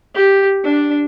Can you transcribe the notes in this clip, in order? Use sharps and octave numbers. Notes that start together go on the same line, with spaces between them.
G4
D4